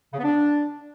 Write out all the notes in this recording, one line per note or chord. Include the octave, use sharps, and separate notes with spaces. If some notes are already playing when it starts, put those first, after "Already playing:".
C#3
B3
D4